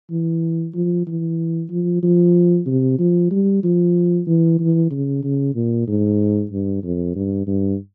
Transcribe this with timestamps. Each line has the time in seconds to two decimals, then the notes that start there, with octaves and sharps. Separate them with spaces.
0.11 E3
0.74 F3
1.07 E3
1.70 F3
2.03 F3
2.66 C3
2.99 F3
3.31 G3
3.63 F3
4.27 E3
4.60 E3
4.91 C#3
5.23 C#3
5.55 A#2
5.87 G#2
6.51 G2
6.83 F2
7.16 G2
7.47 G2